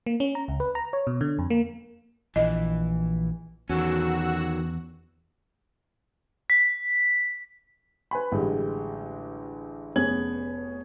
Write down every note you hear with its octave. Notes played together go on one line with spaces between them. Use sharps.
A#3
C#4
A#5
C#2
B4
A#5
C#5
B2
D3
F2
A#3
A#1 E3 D#5
E2 D#3 C#4 F#4 E6
B6
B4 G#5 B5
A1 D3 G3 G#3
F1 B3 C#4 G#4 G#6 F#7